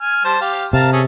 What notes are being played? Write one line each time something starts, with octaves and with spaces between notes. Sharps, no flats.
G#5 F6
G3 C5 A5
G4 F5
C3 A#4 F5 A5
C#4 G#4 A4